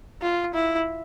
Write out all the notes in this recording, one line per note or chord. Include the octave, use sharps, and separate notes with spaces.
F4
E4